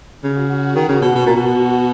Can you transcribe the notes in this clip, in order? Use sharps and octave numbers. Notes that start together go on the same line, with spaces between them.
C#3 F#4
D#3
C#3
B2
B2
A#2
B2